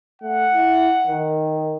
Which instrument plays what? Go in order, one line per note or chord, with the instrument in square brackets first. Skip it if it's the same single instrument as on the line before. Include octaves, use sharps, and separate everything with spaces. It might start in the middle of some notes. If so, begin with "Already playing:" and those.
[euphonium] A3 [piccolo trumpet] F#5
[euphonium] E4
D#3